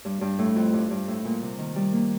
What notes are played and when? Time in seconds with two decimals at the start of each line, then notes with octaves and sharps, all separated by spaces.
0.05 G2
0.21 G2
0.39 A2
0.56 F2
0.73 G2
0.91 G2
1.08 A2
1.25 A#2
1.42 C3
1.58 D#3
1.76 G3
1.92 A#3